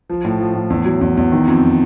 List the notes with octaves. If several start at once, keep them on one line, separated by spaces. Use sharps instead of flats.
F3
A2
F3
A2
E2
F#3
E2
E2
D#3
F2